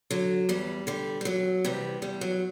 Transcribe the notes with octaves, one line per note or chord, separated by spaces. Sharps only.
D3 F#3
E2 G3
D3 G3
G3
E2 F#3
C3 E3 G3
E2 G3
F#3